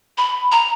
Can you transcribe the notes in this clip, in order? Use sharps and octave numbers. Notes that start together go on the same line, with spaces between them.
B5
A#5